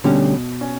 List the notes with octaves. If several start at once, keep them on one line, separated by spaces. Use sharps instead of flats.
D2 B2 D3 G3 C#4
C#4